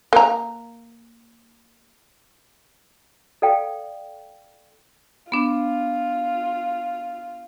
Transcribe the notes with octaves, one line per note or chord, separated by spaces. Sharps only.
A#3 A#5
A4 D5 F5 G5
B3 D4 F4